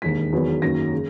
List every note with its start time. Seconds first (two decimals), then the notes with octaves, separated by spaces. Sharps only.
0.02 E1 D#2 D#3 B6
0.32 E2 D#3 F#3 B3
0.62 F#2 D#3 F#3 A#3 A#6
0.93 C#3